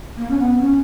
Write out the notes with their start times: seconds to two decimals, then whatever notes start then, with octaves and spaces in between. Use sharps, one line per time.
0.16 A#3
0.30 C#4
0.38 B3
0.56 B3
0.60 C#4